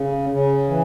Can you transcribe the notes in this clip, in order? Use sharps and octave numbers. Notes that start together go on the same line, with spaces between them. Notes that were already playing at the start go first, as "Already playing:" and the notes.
Already playing: C#3
C#3
E3